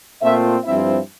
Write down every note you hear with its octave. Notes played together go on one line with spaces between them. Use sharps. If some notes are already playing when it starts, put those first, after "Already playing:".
A#2 A3 C4 F4 E5
G2 F3 C4 E4 E5